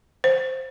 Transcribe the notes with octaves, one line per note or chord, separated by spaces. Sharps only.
C5